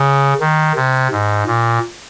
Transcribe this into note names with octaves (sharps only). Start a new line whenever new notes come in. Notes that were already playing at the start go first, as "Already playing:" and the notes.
Already playing: C#3
D#3
C3
G#2
A#2